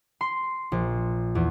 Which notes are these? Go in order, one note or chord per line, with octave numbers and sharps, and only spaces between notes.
C6
A#1
E2